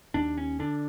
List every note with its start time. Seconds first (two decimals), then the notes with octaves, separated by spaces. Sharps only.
0.14 D#2 D4
0.38 C#4
0.59 D3 D4